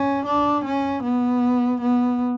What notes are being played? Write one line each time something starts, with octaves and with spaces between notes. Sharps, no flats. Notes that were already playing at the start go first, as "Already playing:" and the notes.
Already playing: C#4
D4
C#4
B3
B3